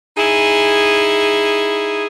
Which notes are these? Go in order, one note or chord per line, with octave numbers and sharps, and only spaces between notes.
D#4 E4 G#4